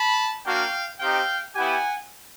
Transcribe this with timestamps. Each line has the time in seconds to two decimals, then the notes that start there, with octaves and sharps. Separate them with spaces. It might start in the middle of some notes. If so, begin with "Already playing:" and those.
Already playing: A5 B5
0.45 A#3 D4 F#4 F5 G5
1.00 C4 D#4 G4 F5 G5
1.55 B3 E4 G4 F#5 G#5